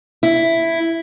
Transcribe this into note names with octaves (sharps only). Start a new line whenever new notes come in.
E4